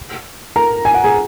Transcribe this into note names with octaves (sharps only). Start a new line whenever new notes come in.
A#4 A#5
G#5
F#5
G#4 G#5